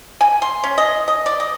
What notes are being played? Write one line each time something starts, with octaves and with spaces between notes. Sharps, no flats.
G#5
C6
C#4
D#5
D#5
D5
D#5